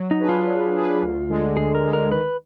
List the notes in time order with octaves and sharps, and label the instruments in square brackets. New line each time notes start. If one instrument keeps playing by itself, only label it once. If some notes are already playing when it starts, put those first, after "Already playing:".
Already playing: [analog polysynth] F#3
[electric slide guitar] D#4
[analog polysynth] D4 G#4 B4
[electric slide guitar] F4
[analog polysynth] F#3
D4 G#4 B4
D2
D3 G#3
[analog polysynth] D2 [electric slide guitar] G#4
[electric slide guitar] A#4
[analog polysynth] D3 G#3
[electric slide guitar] A#4
[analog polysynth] D#3 [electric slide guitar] B4